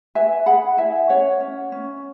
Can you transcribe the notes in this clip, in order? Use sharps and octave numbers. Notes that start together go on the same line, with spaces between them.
B4 E5 G#5
G#4 F#5 B5
E4 E5 G#5
C#4 C#5 F#5
C#4
C#4